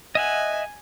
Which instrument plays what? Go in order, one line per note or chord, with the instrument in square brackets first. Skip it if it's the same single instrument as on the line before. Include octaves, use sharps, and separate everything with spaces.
[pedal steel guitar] D#5 E5 F#5 [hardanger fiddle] G#5